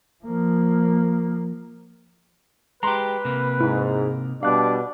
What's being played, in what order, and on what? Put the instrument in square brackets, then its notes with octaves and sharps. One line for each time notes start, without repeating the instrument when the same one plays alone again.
[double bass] F3 A#3
[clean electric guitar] G#3 G4 [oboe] B4 [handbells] A#5 C6
[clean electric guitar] C3 A#3
[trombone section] G#2 [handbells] E4
[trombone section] B2 G3 D4 [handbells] F5 F#6 [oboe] D6